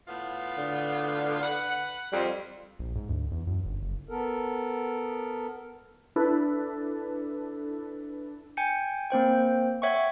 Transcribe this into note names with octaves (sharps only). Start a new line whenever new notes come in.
A2 B3 F4
D3
B4 F#5
F2 G3
A#1
G#2
D2
E2
F#2
G1
F#1
B3 A4 A#4
D4 E4 A4 B4
G5 G#5 G6 C#7
A#3 C4 C5 G5
C#5 E5 F#5 G5 C#6